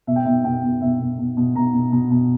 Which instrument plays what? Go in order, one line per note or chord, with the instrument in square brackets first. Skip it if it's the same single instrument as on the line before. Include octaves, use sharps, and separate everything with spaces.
[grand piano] B2 E5
G5
B2 E5
B2 G5
B2
B2 E5
B2
B2
B2
B2 A#5
B2
B2
B2